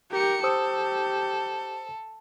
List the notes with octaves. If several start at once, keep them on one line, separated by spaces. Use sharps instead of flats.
G4 A#4 C#7
G4 A4 C5 D#6 E6